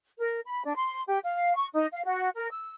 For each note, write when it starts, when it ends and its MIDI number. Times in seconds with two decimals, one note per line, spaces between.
0.19 0.39 70
0.46 0.62 83
0.64 0.75 62
0.76 1.01 84
1.07 1.19 67
1.23 1.55 77
1.55 1.67 85
1.73 1.86 63
1.92 2.02 77
2.05 2.29 66
2.36 2.49 70
2.51 2.75 88